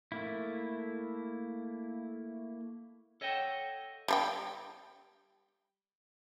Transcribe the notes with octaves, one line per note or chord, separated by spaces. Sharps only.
A3 A#3 E4
A4 C#5 D#5 E5 F#5 G5
G3 A4 G5